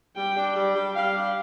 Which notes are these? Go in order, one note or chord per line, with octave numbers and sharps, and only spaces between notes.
G3 G5
D4
G3
G3
G3 F5
D4